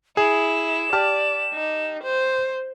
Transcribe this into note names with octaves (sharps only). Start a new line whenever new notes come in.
E4 G#4 E7
G4 D5 A5 F6
D#4
C5